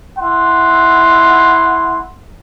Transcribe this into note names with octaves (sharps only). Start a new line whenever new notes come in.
E4 F#5 C6